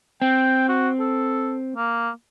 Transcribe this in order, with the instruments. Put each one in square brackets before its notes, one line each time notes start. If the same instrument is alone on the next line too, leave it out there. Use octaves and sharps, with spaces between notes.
[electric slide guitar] C4 [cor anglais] G5
[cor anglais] F#4
A4
A#3